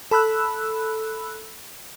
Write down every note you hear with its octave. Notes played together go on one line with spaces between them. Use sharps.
A4 B5 E6 F#6